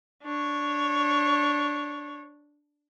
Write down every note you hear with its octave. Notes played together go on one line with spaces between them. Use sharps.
D4 C#5